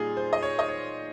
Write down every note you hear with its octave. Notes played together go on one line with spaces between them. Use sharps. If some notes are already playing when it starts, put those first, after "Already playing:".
Already playing: A#2 G3 D#4 F4 G#4
C5
D#5
C#5
D#5
C#5